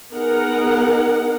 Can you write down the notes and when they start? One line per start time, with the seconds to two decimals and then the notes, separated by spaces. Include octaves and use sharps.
0.14 B3 D#4 G#4 A#4 F#5